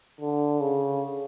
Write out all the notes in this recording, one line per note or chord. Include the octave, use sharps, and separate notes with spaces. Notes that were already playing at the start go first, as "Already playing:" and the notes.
D3
C#3